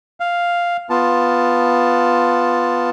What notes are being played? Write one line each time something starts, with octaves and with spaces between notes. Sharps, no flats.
F5
B3 F4 A5